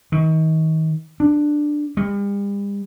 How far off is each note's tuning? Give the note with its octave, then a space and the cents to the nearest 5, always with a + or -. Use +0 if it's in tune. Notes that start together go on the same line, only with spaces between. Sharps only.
D#3 +35
D4 +10
G3 +40